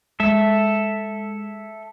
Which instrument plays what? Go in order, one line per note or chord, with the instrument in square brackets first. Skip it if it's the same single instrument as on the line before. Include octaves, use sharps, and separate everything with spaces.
[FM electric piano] G#3 [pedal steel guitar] A4 E5